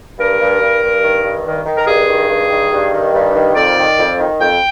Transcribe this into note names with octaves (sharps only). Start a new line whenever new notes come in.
G2 A#4
G2
G2
G2
D#3
G2
D#3
D#3
A#4
G2 G#4
D#3
G2
D#3
G2
D#3
G2
D#3
F2 D5
D#3
F2
D#3
F2 G5